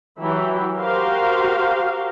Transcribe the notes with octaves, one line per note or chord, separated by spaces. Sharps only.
E3 F#3 E4 G4
F#4 G4 A#4 C5 F5